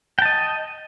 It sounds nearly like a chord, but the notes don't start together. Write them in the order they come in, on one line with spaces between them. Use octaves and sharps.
G5 A5 D#5